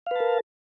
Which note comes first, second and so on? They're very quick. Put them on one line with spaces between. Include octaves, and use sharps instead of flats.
F5 B4 A5 A#4